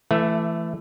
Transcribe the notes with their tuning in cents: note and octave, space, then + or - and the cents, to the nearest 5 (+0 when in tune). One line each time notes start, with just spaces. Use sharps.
E3 +20 A3 +0 E5 +10